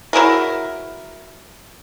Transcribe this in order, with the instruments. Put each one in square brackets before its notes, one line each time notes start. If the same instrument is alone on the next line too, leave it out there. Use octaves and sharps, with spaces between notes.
[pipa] F#3 E4 G#4 A#4